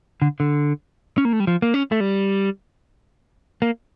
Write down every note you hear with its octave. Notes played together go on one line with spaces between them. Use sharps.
D3
D3
C#4
A#3
A3
G3
F3
A#3
C#4
A3
G3
A#3